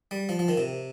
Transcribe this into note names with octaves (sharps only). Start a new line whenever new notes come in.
G3
F3
F3
D#3
C3